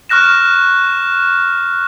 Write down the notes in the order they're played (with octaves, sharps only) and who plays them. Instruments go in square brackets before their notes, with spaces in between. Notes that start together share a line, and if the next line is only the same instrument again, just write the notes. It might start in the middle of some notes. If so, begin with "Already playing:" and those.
[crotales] C#6 F6 F#6 A#6 E7